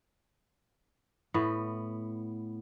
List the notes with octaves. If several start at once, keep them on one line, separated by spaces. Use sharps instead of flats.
A2 B3